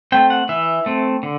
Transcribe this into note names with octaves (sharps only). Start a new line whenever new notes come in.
A3 C4 G5
F#5
E3 E5
A3 C4
D3